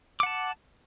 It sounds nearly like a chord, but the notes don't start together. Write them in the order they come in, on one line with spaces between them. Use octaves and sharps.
D6 F#5 A5